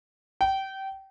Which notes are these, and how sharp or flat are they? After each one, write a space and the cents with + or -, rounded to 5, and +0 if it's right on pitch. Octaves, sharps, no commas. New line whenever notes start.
G5 -25